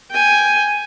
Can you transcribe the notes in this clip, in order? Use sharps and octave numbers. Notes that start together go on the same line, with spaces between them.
G5 G#5